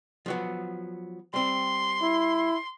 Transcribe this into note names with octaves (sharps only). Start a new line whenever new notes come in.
F3 F#3 B3
G3 C4 C6
E4